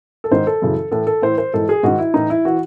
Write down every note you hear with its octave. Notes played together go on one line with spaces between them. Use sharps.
A4
G#2 D#3 C5
A4
F#2 C#3 E3
A2 E3 A4
A4
A2 E3 C5
C5
G#2 E3 A4
G#4
G#2 D#3 F#4
E4
A2 E3 D#4
E4
E3 F#4